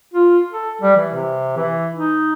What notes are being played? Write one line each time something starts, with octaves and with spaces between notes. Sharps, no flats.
F4
A4
G3
E3
C3
E3
D#4